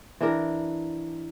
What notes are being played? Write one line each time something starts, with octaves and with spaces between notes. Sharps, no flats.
E3 D4 A#4